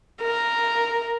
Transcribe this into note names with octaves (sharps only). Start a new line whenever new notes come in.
A#4